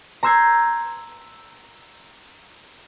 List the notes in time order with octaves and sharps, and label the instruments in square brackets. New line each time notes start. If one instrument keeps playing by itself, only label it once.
[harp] A#5 C6 E6 G6 G#6 C7